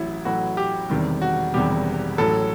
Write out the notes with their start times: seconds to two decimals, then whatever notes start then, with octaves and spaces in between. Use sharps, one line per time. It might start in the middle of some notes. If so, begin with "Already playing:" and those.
Already playing: A1 A2 F#3 E4
0.25 A1 A2 F#3 F#4
0.57 G4
0.90 E1 E2 C3 D#3 G3
1.22 F#4
1.54 E1 E2 C3 D#3 G3 G4
2.18 A1 A2 F#3 A4